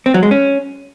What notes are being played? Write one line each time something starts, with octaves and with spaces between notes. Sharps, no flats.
C4
F#3
G#3
C#4